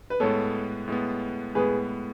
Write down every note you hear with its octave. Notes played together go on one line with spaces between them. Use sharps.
B4
A2 G#3 B3 A4 C#5
A2 G#3 B3
A2 G#3 B3 G#4 B4